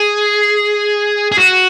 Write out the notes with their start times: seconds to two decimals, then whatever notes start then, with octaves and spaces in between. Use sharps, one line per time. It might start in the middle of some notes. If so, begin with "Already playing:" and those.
Already playing: G#4
1.32 G#4
1.38 F#4